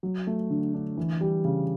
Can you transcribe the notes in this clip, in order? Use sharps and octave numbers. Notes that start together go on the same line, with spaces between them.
F#3
A3
D3
D4
E3
G3
C#3